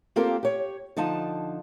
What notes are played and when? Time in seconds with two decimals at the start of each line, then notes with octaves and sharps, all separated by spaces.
0.16 A#3 C4 F4 G4 A4 A#4
0.43 G4 C#5
0.96 D3 F3 D#4 A5